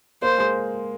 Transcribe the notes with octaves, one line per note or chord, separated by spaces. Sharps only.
A#3 C5
G#3